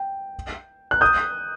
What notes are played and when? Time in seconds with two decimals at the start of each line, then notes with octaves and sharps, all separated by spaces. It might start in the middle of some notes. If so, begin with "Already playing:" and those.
Already playing: G5
0.91 F#6
1.01 D#6 G6